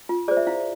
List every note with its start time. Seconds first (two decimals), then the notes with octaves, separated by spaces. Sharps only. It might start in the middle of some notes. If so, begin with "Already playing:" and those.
0.09 F4
0.28 G#4 C5 D5
0.37 E5
0.47 E4 F5